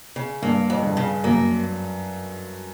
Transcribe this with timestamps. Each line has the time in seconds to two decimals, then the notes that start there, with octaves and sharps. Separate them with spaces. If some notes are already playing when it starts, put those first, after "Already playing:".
0.16 C#3
0.42 G2 A#3
0.70 F2
0.83 G2
0.97 C#3
1.24 F#2 A#3